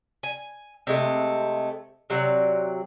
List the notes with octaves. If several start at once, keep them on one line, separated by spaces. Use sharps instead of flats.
G#5
C3 G#3 A3
C3 F#3 D5